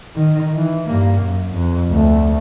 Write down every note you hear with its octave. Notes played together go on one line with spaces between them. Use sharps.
D#3
E3
G2 A#3
F#2
F2
D2 A3